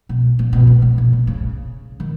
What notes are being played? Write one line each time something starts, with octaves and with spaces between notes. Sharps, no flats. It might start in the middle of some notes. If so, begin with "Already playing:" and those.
B2
A#2
B2
A#2
A#2
A#2
C3
C#3
D#3